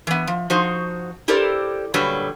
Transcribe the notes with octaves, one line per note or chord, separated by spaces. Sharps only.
E3 B3
F3
F3 D#4 F#4 C5
E4 G4 A4 A#4 C5 D5
F#2 A#2 D3 F#3 G3 B4